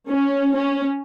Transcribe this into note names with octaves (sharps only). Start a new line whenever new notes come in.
C#4
C#4